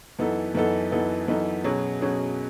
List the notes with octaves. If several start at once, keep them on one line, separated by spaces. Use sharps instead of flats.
F#2 E3 B3 D#4 A4
F#2 E3 B3 D#4 A4
F#2 E3 B3 D#4 A4
F#2 E3 B3 D#4 A4
B2 F#3 C#4 G#4
B2 F#3 C#4 G#4